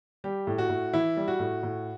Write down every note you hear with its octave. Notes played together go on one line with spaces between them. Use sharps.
G3 G4
A2
F#4
A2
E3 E4
G3
F#4
A2
A2